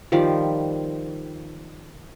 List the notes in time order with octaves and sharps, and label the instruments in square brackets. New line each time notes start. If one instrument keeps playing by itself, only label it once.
[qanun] D#3 F3 G3 D5